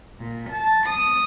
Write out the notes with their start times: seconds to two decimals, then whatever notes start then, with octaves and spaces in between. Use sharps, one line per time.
0.19 A#2
0.51 A5
0.88 D#6